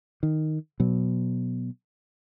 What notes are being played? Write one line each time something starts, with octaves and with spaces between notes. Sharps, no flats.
D#3
B2 F#3